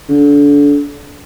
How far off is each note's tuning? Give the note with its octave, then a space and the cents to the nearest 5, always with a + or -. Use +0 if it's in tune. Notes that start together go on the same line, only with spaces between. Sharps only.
D3 -30